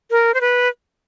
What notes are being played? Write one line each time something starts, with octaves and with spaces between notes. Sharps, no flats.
A#4
C5
B4